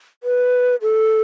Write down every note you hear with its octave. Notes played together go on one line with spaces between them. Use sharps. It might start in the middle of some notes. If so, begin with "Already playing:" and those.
B4
A4